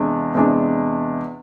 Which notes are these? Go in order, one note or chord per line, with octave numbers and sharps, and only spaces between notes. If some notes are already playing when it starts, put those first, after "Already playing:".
Already playing: E2 C3 G#3 D4
E2 C3 G#3 D4